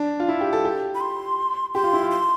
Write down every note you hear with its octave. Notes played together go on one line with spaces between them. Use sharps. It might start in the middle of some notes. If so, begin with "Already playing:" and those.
Already playing: D4
F4
E4
G4
A4
G4
B5
C6
G4 C6
F4
E4
F4
C6